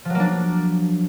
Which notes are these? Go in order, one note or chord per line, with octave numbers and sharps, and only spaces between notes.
F3 F#3 A#3 D4